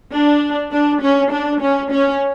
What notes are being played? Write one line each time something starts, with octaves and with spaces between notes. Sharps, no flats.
D4
D4
C#4
D4
C#4
C#4